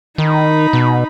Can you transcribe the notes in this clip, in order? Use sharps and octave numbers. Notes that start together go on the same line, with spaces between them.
D#3 D#4 B5
B2